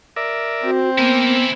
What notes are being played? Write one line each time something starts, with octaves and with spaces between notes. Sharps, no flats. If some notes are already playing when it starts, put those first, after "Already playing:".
A#4 D5 E5
C4 F#4
A#3 B3 E4 G#5